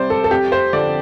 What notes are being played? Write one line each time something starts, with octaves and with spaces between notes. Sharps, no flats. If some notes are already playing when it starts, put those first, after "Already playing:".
Already playing: C2 C3 G3 C5 D5
A4
A4
F2 G4
C5
D3 F3 D5